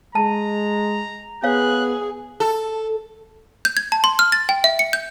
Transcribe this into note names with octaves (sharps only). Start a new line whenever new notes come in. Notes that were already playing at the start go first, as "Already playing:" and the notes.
G#3 A5 A#5
B3 G#4 C#5 F5 F#6
A4
G6
G#6
A5
C6
F6
A6
G5
E5
C#7
G6